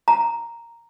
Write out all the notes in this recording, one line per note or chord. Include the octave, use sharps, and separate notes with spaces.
A#5